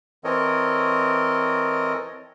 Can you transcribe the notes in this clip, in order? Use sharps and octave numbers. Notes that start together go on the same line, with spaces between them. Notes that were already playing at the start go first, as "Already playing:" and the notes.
E3 C4 A4 A#4 C#5 D#5